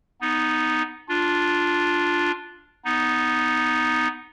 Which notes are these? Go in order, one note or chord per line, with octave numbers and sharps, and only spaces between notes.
B3 D#4
D4 F4
B3 D#4